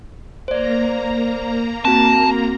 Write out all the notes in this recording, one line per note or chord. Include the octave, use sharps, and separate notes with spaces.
A#3 C5 D5 A#5
C4 F#4 A5